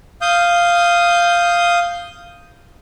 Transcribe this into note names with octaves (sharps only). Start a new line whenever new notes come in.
F5 D#6 G6